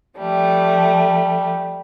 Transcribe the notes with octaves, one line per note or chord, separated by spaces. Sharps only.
F3 G3 A3